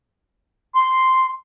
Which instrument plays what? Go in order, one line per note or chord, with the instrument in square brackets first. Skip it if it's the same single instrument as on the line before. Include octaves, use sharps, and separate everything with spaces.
[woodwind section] C6